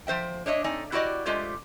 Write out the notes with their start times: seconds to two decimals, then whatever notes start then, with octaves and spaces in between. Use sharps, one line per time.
0.07 F3 C5 E5 G5
0.46 D4 C#5 D#5 E5
0.64 A3 C4 D#4 D5 G#5
0.92 E4 F#4 G4 B4 D5 D#5
1.26 G#3 A3 F4 G4 C5